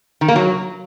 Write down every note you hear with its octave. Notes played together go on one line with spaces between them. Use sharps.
D#3
A#3
F#3